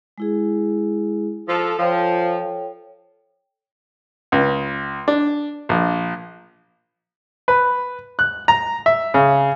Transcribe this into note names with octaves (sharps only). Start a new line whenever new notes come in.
G#3 E4 G#4
F3 A4
F3 A4 C#5 G5
C#2
D4
A#1
B4
F#6
A#5
E5
C#3